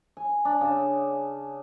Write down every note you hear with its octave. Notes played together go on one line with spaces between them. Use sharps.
G#5
D4
C#3